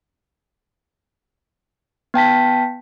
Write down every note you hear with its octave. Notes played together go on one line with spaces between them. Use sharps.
B3 G5 A5 B6